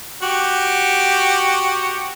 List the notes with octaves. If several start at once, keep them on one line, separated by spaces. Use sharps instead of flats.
F#4 G4